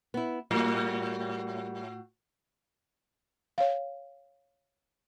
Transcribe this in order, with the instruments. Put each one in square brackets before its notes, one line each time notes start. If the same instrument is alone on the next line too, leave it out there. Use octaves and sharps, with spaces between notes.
[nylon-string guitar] B3 E4
[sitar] A2 F#4 [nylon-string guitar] G3 A#3
[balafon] C#5 F5